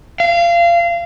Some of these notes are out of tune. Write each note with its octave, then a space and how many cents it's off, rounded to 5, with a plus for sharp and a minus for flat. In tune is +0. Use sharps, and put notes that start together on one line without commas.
F5 -25